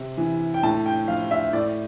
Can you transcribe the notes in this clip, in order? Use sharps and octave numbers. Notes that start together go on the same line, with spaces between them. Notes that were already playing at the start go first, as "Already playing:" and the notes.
Already playing: C3
E3
G5
A2 A5
G5
F3 F5
E5
A2 D5